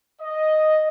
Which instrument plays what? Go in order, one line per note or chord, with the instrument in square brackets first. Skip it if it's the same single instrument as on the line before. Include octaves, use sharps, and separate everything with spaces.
[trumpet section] D#5